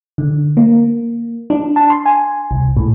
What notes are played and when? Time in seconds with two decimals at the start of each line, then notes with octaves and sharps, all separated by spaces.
0.18 D3
0.57 A#3
1.50 D4
1.76 A5
1.90 C6
2.06 G#5
2.51 C2
2.77 A2